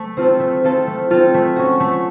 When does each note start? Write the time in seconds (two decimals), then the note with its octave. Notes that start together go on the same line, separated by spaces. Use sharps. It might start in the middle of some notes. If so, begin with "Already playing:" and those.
Already playing: A3
0.17 C4 F4 A4
0.40 A3
0.64 C4 F4 A4
0.87 A3
1.10 C4 F4 A4
1.34 A3
1.56 C#4 F#4
1.80 A3